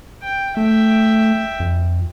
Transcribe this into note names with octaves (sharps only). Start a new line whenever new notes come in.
G5
A3 E5 G5
F2